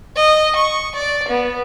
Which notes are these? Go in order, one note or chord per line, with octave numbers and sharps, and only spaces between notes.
D#5
C#6
D5
B3